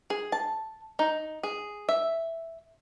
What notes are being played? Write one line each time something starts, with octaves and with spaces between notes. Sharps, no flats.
G#4
A5
D#4
G#4
E5